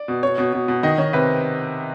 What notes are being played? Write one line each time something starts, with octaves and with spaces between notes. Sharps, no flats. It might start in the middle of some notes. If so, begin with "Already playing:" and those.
Already playing: D5
B2
B2 C#5
B2
B2
B2
D#3 D#5
D#3 C#5
C3 B4